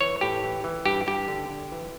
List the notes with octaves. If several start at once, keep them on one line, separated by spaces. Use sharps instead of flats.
E3 C#5
A2 G4
E3
E3
G2 G4
G2 G4
D3
D3
E3